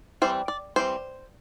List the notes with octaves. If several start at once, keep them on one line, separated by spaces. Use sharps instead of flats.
E3 G3 C4 C5
D5
E3 G3 C4 C5